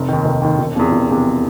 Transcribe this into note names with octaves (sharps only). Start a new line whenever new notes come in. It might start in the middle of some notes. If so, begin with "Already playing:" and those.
Already playing: F1
D#2 D#3
F1
D#2 D#3
E1
E2 C3 F3
E1
E2 C3 F3